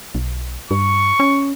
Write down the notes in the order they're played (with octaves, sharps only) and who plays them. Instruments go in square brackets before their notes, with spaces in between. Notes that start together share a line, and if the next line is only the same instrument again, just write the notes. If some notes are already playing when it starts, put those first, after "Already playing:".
[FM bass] B1
[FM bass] G2 [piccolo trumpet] C#6
[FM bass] C#4